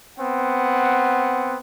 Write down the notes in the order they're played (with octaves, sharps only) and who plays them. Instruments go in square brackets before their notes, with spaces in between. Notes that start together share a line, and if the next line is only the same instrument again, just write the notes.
[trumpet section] B3 C4 F#5